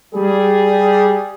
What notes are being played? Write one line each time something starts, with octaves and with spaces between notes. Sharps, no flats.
G3 G#4